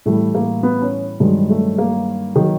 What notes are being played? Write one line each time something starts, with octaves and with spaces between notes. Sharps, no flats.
A2 E3 G3 A3
A#3
B3
C#4
G2 D#3 F#3 G#3
A3
A#3
D#3 F#3